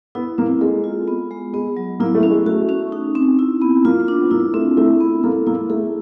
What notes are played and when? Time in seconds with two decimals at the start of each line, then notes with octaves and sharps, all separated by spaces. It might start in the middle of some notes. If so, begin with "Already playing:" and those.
0.15 B3 E4
0.38 A#3 C4
0.61 G#3 A4
0.84 F4
1.08 B3
1.31 G#3
1.53 G#3 B3
1.77 F#3
2.00 A#3 E4
2.15 A3
2.23 C#4
2.30 G#3
2.46 A3 F#4
2.69 C#4
2.92 D#4
3.15 C4
3.39 E4
3.62 B3
3.85 A#3 F4
4.08 D4
4.22 B3
4.31 A#3 E4
4.54 A3 C4
4.77 A3 E4
5.00 B3
5.24 A#3 A4
5.47 A#3 E4
5.70 A3 G#4